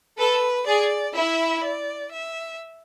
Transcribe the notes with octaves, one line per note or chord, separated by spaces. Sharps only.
A4 B4
G#4 D5
E4 E5
D5
E5